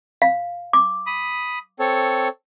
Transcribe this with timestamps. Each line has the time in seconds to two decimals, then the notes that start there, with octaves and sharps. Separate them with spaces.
0.22 F5
0.73 D6
1.07 B5 D#6
1.80 C4 A4 C#5